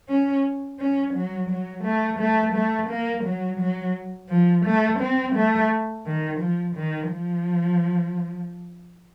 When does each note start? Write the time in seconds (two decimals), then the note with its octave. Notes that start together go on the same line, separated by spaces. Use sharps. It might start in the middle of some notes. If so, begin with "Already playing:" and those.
0.08 C#4
0.79 C#4
1.14 F#3
1.50 F#3
1.84 A3
2.19 A3
2.55 A3
2.90 A#3
3.25 F#3
3.60 F#3
4.29 F3
4.65 A3
5.00 C4
5.36 A3
6.06 D#3
6.41 F3
6.76 D#3
7.10 F3